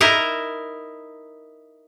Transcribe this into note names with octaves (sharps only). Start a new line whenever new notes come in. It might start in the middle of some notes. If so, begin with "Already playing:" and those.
D#4 E4 A#4